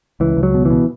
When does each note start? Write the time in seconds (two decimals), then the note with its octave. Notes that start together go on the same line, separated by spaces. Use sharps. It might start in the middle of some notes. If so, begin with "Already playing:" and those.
0.20 C#2 E3
0.37 C#2
0.43 F#3
0.54 B2
0.65 E3
0.71 B2